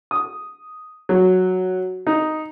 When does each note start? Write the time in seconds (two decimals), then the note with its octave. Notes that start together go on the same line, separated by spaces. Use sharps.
0.11 D#6
1.09 F#3
2.07 D#4